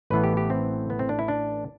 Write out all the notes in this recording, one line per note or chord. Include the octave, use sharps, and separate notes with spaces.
A1 A2 E3 B3 B4
G4
G4
C4
B3
C4
D4
E4
D4